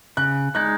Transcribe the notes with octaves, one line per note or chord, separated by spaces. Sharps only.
C#3 F#6
G#3 D#4 F#6